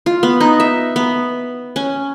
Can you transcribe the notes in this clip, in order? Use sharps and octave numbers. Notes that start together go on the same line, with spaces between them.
F4
B3
D#4
E5
B3
C#4